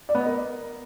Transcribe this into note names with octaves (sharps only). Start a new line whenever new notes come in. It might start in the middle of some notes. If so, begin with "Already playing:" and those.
D5
B3
D#5
A#4